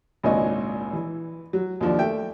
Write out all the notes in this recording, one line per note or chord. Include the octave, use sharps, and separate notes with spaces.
G#1 C#2 A#2 D4 C#5 D#5
E3
F#3
D#2 F3 D4
A3 E5 G5